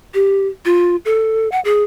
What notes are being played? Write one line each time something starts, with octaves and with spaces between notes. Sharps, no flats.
G4
F4
A4
F#5
G#4